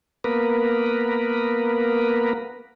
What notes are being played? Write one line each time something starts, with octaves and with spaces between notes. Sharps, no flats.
A#3 B3 A#4 B4